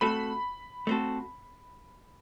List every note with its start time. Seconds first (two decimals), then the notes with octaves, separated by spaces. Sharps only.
0.01 A3 C4 F#4 A4 B5
0.87 A3 C4 F#4 A4